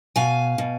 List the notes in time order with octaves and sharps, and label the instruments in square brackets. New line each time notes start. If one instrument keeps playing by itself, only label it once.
[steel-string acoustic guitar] B2 F5 G#5
B2